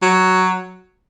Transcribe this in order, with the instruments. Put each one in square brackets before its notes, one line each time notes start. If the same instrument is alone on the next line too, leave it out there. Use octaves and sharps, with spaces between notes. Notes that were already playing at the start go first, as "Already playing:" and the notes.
[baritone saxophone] F#3